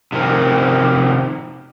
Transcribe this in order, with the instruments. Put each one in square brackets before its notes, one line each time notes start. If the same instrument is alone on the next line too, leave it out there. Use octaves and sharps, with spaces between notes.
[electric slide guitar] C3 D#3 F3 C4 C#4